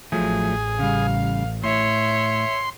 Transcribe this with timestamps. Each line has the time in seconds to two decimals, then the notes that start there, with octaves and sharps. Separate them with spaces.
0.12 A1 F3 F#3 A3 G#4
0.79 C#3 G3 F5
1.63 A2 C#5 E5 C6